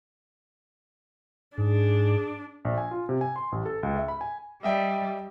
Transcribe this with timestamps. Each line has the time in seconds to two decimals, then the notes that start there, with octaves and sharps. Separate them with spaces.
1.58 G#2 D4 G#4
2.65 A#1
2.78 G#5
2.91 F4
3.09 C3
3.21 G#5
3.36 C6
3.52 A1
3.66 A4
3.83 C#2
3.96 E5
4.08 B5
4.21 G#5
4.63 G3 D#5 E5 G5